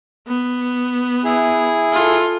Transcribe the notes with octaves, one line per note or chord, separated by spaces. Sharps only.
B3
E4 G#4
F4 A4